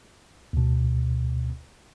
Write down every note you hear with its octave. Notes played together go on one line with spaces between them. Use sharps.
D2 B2